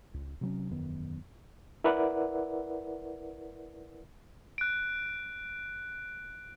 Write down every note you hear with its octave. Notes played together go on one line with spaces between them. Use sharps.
C#2
C3 F#3 C#4
E1 F#2 D#3 B3
E4 A#4 B4 D5 E5 F#5
F#6 D7